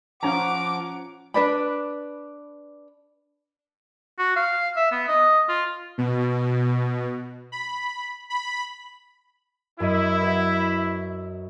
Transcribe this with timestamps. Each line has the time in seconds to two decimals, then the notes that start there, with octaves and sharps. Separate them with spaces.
0.23 F3 C#4 F#5 A#5 D6
1.34 D4 B4 D5 B5
4.18 F#4
4.36 F5
4.76 E5
4.91 B3
5.08 D#5
5.49 F4
5.98 B2
7.52 B5
8.30 B5
9.80 F#2 E4 D#5
10.22 F#4 B4